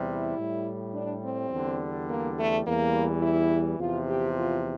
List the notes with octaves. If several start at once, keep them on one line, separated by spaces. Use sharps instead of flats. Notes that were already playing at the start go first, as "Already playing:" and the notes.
Already playing: E2 C3 G3
E4
A2 G3
D4
C4
E2 D3 G3
A#3
A3
E2 E3 G3 A#3
E4
E2 C3 F3 F4
G4
F4